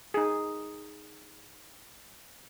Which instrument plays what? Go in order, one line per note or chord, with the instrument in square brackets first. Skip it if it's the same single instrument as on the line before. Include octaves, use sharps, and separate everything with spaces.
[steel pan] D#4 G#4